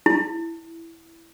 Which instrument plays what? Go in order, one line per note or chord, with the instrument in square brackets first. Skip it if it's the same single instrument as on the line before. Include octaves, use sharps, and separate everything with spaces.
[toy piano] E4